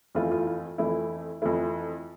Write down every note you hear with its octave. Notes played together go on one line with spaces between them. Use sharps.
F2 E3 A3 E4 F4
F4
F4
F2 E3 A3 E4
F2 E3 A3 E4